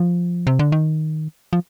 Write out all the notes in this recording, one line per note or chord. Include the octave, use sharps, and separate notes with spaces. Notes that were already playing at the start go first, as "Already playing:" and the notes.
Already playing: F3
C3
D3
D#3
F3